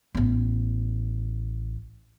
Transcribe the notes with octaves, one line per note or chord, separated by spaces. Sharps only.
A1 B3